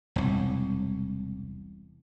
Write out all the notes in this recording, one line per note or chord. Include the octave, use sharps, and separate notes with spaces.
E1 C2